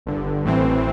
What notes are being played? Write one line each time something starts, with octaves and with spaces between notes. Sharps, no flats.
G1 G2 D3
A1 A2 E3 C4